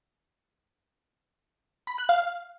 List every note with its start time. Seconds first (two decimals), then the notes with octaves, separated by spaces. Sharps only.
1.87 B5
1.98 F#6
2.09 F5